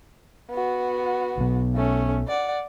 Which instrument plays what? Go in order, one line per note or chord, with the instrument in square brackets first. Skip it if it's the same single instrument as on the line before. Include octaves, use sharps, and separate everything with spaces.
[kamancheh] B3 F#4
[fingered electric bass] B1 B2
[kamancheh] A3 C#4
D5 F#5